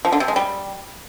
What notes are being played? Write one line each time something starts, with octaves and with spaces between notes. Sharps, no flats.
F3
D3
C3
G#3
G3